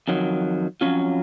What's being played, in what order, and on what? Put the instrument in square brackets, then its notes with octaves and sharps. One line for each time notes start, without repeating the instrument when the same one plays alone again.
[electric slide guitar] F2 D#3 F#3
F2 D#3 F#3 C#4 F4